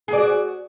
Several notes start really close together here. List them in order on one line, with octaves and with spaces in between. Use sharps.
G#4 D5 F#4